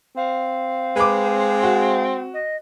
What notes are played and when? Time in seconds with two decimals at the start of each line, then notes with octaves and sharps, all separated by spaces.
0.16 C4 F5
0.96 G#3 B4 D6
1.63 F#4
2.33 D#5